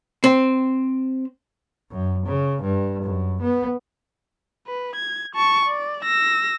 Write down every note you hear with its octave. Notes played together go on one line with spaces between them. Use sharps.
C4
F#2
C#3
G2
F#2
B3
B4
G#6
A5 C#6
D5
E6 A#6